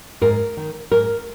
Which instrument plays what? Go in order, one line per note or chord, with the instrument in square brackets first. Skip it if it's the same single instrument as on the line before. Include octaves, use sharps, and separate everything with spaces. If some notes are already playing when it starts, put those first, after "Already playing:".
[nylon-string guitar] G#2 A#4
D#3
G#2 A#4